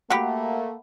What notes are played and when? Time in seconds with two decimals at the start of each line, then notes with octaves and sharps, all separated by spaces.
0.10 A3 A#3 F#4 G4 F#5 B5